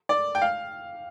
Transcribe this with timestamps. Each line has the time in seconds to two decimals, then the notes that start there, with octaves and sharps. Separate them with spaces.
0.09 D5
0.35 G5
0.42 F5